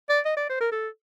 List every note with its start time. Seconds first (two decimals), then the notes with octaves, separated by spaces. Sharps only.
0.09 D5
0.25 D#5
0.37 D5
0.49 C5
0.60 A#4
0.72 A4